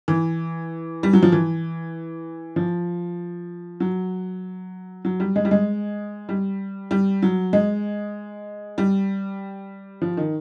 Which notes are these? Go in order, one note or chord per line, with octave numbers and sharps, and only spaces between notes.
E3
G3
F#3
F3
E3
F3
F#3
F#3
G3
G#3
G3
G#3
G3
G3
F#3
G#3
G3
F3
D#3